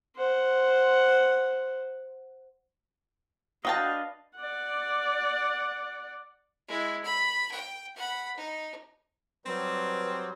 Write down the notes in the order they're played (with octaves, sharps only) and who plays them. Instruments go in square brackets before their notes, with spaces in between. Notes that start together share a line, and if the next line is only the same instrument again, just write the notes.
[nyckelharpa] C5 F#5
[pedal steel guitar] D4 B4 D#5 [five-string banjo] F#4 G5 A5 [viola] F5
[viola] D5 F#5
[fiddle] G#3 E4
B5
G5
F#5 B5
D#4
[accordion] F#3 G3 [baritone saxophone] C4 [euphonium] B4